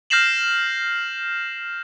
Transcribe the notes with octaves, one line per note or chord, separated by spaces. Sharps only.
F6 G6 A#6 C7 E7 F#7